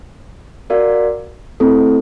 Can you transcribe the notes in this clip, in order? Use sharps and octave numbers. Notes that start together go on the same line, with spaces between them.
F#4 A#4 D5 F5
A3 C4 E4 A4